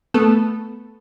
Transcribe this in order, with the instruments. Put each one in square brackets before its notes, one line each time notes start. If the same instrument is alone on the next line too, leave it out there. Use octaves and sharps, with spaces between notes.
[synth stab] A3 B3 A4